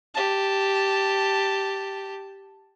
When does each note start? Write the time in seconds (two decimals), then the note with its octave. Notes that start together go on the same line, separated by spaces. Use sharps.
0.14 G4 A5